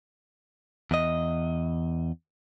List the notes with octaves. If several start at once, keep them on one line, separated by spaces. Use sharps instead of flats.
E2 D#5